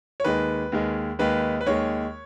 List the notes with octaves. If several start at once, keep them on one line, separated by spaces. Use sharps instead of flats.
C#5
D#2 D#3 G#3 B4
D#2 D#3 G#3
D#2 D#3 G#3 B4
B4
D#2 D#3 G#3 C#5